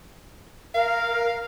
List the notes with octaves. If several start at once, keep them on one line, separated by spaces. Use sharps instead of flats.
A#4 F5